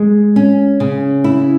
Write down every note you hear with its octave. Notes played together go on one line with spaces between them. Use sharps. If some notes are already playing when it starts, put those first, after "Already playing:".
Already playing: G#3
C#4
C#3
E4